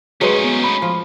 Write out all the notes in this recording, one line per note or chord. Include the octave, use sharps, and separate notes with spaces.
F#3 G#3 A3 C#4 D#4 G#4 B4
B3
B5
F3